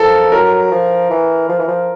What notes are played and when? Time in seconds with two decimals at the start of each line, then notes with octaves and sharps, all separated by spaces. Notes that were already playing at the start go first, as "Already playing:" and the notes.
Already playing: F3 A4 A#4
0.32 F#3 A#4
0.72 F3
1.10 E3
1.49 F3
1.59 E3
1.68 F3